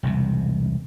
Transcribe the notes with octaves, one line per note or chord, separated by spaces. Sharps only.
E1 C2 C3